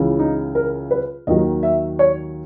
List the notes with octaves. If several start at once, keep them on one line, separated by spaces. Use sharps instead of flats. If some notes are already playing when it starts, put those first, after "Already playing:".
Already playing: C#2 C#3 E3
D#4
A#4
B4
D#2 D#3 F#3 D#5
E5
C#5